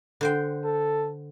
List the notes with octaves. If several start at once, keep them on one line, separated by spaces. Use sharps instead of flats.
D3 C5 G5
A4